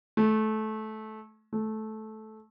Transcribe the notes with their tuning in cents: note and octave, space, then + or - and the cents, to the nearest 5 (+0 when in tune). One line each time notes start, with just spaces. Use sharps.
A3 -20
A3 -15